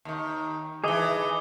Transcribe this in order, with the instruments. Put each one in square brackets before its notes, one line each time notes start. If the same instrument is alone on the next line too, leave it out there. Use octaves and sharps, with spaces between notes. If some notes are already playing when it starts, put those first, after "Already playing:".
[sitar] D#2 D#3
[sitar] D#2 E3 [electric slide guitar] G#4 D#5 [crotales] D6 D#6 G7